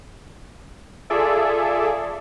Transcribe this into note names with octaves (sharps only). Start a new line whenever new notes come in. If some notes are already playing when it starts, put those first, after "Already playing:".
F4 G#4 A4 D5 E5